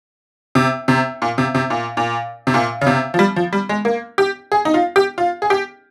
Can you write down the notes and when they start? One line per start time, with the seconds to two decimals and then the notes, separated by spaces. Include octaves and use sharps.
0.55 C3
0.88 C3
1.22 A#2
1.38 C3
1.55 C3
1.70 A#2
1.97 A#2
2.47 C3
2.54 A#2
2.81 C#3
2.87 C3
3.14 F3
3.19 G3
3.36 F3
3.53 G3
3.69 G#3
3.85 A#3
4.18 G4
4.52 G#4
4.65 D#4
4.74 F4
4.96 G4
5.18 F4
5.42 G#4
5.50 G4